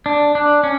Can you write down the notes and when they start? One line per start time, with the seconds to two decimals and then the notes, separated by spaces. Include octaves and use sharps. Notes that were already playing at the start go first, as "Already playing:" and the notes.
0.06 D4
0.35 D4
0.63 C#4